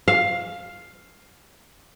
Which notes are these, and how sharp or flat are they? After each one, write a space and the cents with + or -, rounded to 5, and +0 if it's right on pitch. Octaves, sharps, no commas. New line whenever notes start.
F5 +5